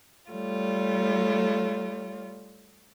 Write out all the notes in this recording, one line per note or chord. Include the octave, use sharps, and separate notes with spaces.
G3 A3 F4 C#5